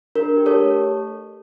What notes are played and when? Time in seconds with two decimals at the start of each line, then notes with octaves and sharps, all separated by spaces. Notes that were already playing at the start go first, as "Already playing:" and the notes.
0.15 D4 A#4
0.37 G4
0.46 A4 C#5
0.56 A3